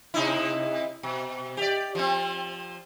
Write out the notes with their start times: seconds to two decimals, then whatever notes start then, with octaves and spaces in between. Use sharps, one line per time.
0.14 C3 D#4 E4
1.03 B2
1.57 G4 D5
1.95 F3 C4